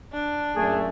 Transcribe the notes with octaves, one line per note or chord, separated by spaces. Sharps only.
D4
F#2 A#2 A3 G#4